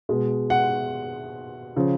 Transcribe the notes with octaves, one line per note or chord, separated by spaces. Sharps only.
B2 G#3
F#5
C#3 F3